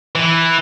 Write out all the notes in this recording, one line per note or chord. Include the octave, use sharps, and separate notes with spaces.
E3